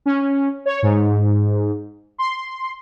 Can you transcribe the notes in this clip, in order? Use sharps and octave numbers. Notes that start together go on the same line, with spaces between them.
C#4
C#5
G#2
C6